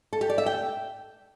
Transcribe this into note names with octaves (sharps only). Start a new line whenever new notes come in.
A4
G4
D5
E5
G5